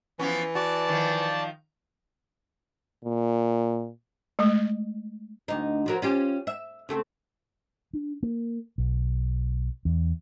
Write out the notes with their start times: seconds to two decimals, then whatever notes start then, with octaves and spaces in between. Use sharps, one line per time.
0.19 E3 F3 B3 C#4
0.55 F#4 D5 A5
0.89 D#3 F3
3.04 A#2
4.39 G#3 A3
5.48 D2 D#4
5.86 F3 F#3 A#4
6.02 C#4 F4 G4
6.47 E5
6.89 C#3 A3 C4
7.93 D4
8.23 A#3
8.78 B1
9.85 E2